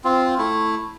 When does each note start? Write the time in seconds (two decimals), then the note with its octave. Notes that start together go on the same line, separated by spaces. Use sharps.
0.04 C4 F4
0.38 A3 E4